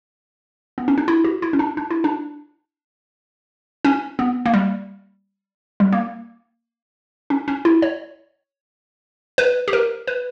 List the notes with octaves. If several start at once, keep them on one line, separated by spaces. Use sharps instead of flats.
B3
C#4
D4
E4
F#4
E4
C#4
D4
D4
E4
D4
C#4
B3
A#3
G3
G3
A#3
C#4
C#4
E4
C#5
B4
G4
A#4
B4